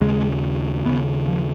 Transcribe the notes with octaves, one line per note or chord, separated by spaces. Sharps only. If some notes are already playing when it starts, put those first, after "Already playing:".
D#2 C#3 G#3
D#2 C#3 B3
F3